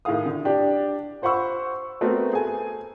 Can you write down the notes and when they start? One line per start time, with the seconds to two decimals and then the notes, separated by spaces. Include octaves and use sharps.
0.05 A2 D#3 G#4 F5 D#6
0.26 D3
0.45 D4 G4 D5
1.22 F4 C5 F#5 B5 C#6 E6
2.01 A3 B3 C4 F#4 A#4
2.33 G#4 A4 G#5